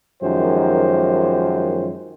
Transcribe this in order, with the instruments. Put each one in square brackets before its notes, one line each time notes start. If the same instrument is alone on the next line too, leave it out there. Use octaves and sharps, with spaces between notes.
[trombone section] F#2 D#3 F3 G#3 G4 C5